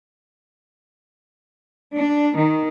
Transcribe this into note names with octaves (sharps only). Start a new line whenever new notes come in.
D4
D#3